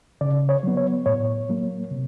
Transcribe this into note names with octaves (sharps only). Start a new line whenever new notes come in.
C#3 D5
C#5
F#3 B3
C#5
A2 C#5
F#3 A#3
C3